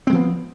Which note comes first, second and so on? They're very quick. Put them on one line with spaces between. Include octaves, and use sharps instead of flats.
C4 G#3 F3 B3